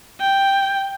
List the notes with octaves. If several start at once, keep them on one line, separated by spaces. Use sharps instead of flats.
G5